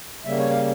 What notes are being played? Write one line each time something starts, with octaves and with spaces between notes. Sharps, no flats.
C#3 G3 A#3 E5
C#5
F5